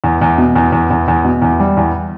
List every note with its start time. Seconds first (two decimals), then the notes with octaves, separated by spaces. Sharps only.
0.04 E2
0.21 E2
0.38 B2
0.56 E2
0.72 E2
0.90 E2
1.08 E2
1.24 B2
1.42 E2
1.60 G3
1.77 E2